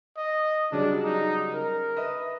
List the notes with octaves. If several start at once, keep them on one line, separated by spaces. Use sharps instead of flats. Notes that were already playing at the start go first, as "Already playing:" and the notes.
D#5
C#3 F#3 G3 D4
D#4
A#4
B4 D#5 E5